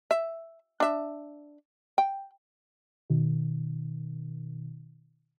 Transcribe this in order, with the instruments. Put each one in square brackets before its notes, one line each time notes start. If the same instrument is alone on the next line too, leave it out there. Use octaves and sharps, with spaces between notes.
[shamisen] E5
D4 E5
G5
[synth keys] B2 D#3